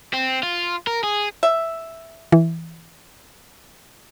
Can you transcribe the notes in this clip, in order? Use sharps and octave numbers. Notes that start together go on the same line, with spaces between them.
C4
F4
A#4
G#4
E5
E3